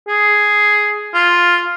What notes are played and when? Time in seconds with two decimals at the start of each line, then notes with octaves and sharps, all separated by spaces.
0.08 G#4
1.14 F4